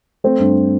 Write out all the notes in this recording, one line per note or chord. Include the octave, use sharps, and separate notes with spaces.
A3 C4
G2